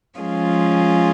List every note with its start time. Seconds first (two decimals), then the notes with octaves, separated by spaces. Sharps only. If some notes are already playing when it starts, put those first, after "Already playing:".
0.19 F3 G#3 C#4 F4 G#4